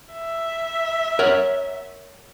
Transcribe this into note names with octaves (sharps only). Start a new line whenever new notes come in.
E5
A#4 C#5 F#5